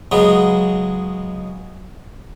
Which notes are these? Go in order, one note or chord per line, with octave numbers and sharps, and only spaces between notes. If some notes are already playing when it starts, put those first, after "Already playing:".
C#3 F#3 G#3 B3